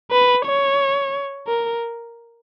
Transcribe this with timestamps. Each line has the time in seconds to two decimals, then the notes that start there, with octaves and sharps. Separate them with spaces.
0.11 B4
0.45 C#5
1.47 A#4